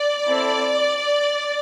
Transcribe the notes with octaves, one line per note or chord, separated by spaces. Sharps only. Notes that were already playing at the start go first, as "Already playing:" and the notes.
Already playing: D5
C4 E4 A4